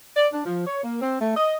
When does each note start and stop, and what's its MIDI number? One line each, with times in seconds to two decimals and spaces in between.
0.15 0.26 74
0.32 0.40 62
0.44 0.64 53
0.65 0.84 73
0.84 0.98 58
1.01 1.18 60
1.20 1.34 57
1.35 1.56 75